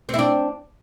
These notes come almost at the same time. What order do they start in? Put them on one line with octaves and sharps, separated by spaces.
C4 E4 D4